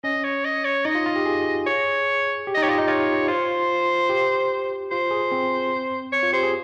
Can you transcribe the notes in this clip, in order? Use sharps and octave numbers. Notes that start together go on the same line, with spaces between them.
C#4 D#5
C#5
D#5
C#5
D#4 D#5
F4
F4
G4
G#4
C#5
G4
D#5
D#4
G4 C#5
F4 D#5
D#4
F4 C#5
F4 C5
G4
F4 C5
G#4
C4
C#5
F4
G4 C5
G#4